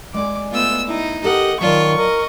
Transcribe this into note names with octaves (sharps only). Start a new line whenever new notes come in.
G#3 D5 G#5 D6
A3 B3 F4 E6
D#4 E4
G4 A4 A#4 D#5 F#5
D#3 F#3 F4 D5 A5 C#6
A#4 D#5